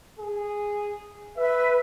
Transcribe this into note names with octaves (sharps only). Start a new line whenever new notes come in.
G#4
B4 E5